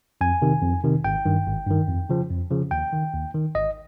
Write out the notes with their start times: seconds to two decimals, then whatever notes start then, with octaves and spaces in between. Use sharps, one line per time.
0.21 F2 G#5
0.42 C3 D#3
0.62 F2
0.84 C3 D#3
1.04 G#1 G5
1.26 G2 D#3
1.46 G#1
1.67 G2 D#3
1.88 F2
2.10 C#3 F3
2.30 F2
2.51 C#3 F3
2.71 D#2 G5
2.93 D#3
3.14 D#2
3.35 D#3
3.55 G#1 D#5